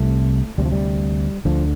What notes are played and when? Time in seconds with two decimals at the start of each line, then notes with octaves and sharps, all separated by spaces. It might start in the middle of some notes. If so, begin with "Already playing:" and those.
Already playing: C2 C3 A3
0.58 D2 C3 G3
0.65 F3
0.72 G3
1.45 D2 D3 F3